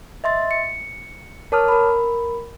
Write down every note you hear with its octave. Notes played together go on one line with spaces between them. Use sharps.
D#5 E5 C6 A6
C#7
A#4 C#5 A5 D6 D#6 F6
A#4 B5